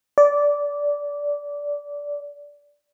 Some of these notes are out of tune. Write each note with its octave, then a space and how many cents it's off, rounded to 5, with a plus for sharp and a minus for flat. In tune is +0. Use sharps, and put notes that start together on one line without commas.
D5 -15